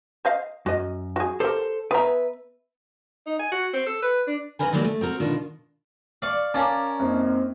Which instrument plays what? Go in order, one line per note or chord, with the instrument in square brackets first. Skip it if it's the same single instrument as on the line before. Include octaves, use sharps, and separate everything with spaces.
[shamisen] C5 D#5 F5
[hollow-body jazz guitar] F#2 [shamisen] F#4 D#5
[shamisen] F#4 G#4
[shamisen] G4 A#4 [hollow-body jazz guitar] A4 C5
[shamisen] B3 A#5 [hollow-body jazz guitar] B4 E5
[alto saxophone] D#4
G#5
F#4
C4
A4
B4
D4
[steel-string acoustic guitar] G#2 C3 C4 A#4 B4 G#5
D#3 E3 F#3 G3 A#3 B4
A3
C4 F#4 A#4
B2 D#3 D4 F4
[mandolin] D5 C#6 [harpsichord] F5
[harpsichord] C#4 [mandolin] A#4 D5 A5 [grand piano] F5 G#5 D6
[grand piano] F#2 A#3 D#4 [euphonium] C4